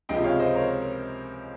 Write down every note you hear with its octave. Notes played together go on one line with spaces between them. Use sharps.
C#2 C3 F3 G#3 D#5 G5
C#5 F5
C5 D#5
A#4 C#5